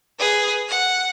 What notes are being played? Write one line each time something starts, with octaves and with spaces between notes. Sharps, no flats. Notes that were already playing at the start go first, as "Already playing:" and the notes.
G#4 B4
F#5